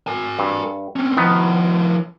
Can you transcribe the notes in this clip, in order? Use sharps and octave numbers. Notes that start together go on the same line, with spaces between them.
A#4 G#5
G2
C4 C#4
D#3 F3 B3 E4